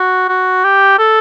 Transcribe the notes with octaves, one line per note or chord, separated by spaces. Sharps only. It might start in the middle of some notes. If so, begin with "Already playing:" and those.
Already playing: F#4
F#4
G4
A4